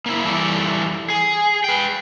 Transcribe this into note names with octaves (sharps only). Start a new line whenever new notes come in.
A#3 C#4 E4
E3 G3 A3 A4 D5
G#4
B4 G5